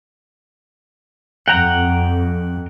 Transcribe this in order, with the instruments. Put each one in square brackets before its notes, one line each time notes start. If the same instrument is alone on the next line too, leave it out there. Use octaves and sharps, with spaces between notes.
[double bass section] F2 [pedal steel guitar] F#5 G5 A#5